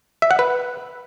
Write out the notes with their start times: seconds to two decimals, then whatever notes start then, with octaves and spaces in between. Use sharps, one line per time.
0.22 E5
0.31 F#5
0.39 B4